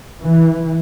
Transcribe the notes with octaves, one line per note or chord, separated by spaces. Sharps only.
E3